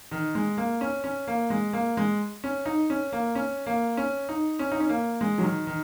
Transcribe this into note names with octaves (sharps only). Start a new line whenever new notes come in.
D#3
G#3
A#3
C#4
C#4
A#3
G#3
A#3
G#3
C#4
D#4
C#4
A#3
C#4
A#3
C#4
D#4
C#4
D#4
C#4
A#3
G#3
F#3
D#3
D#3